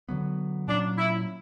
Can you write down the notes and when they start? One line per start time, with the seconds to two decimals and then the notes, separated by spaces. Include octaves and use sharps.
0.09 D3 F#3 B3
0.68 A#2 F#3 C#4 D4
0.98 E4